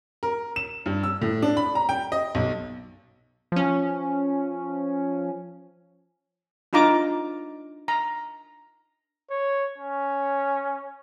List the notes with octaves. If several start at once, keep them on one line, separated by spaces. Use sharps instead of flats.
A#4
E7
G2
E6
A2
D4
B5
A#5
G5
D#5
B1
F3 C#4
D4 D#4 F4 A#5 D6
A#5
C#5
C#4